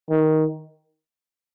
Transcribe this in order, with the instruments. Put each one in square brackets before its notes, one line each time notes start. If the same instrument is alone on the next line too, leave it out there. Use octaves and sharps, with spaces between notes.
[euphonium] D#3